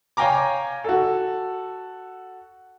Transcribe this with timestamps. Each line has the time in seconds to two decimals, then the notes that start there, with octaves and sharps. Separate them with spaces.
0.17 C#5 F5 G5 G#5 A#5 D6
0.84 F#4 A4